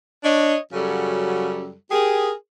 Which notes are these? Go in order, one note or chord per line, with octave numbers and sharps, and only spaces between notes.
D4 C#5 D#5
F#2 C#3 F#3 G3 F#4 A4
G4 G#4 A#4